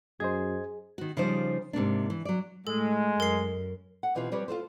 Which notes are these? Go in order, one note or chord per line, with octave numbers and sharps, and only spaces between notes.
F#2 G#4 C5 D#5 G#6
D#3 F#4
C#3 F3 G3 D#4 G4 C5
G#2 C3 A#3 D4
E3
F#3 D5
A2 G#3 A4
F#2 A#4 C7
F#5
B2 E3 C4 F4 G4
F3 G3 C4 G4 B4 C#5
F4 F#4 A4 C5